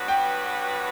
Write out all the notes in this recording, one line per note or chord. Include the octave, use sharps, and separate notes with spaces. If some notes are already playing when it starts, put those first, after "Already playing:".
Already playing: G2 F#3 B3 F#4 B4
G5